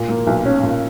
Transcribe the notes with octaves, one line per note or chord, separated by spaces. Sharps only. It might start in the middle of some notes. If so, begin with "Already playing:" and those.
Already playing: A#2
A#3
B1
C#4
A#2